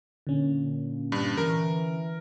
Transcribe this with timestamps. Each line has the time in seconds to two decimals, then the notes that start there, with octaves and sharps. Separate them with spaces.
0.27 A#2 D3 C#4
1.12 G2
1.38 E3 A#4